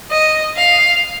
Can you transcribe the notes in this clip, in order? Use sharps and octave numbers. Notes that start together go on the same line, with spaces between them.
D#5
F5